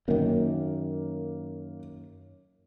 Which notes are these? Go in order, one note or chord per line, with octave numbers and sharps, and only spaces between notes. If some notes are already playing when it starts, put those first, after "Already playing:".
F#2 D#3 A#3